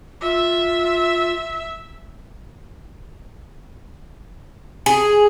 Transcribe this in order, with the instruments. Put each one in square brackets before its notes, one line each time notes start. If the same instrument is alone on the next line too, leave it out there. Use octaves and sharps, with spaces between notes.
[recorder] F4 [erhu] E5
[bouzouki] G#4